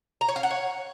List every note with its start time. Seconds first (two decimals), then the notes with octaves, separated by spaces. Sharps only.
0.21 A#5
0.28 C#5
0.36 F5
0.43 F#5
0.51 C#5